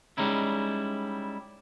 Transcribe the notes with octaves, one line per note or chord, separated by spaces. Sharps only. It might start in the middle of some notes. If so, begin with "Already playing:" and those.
G3 G#3 C#4 D#4 E4